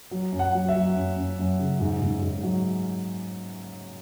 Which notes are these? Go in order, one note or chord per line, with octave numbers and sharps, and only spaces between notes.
F#3
F#2
F#5
F#3
E5
F#3
F#2
F#2
F#2
C#3
G#2
G#2
G#2
F#3